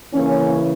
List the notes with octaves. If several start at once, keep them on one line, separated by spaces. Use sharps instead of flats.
C#3 E3 A#3 C#4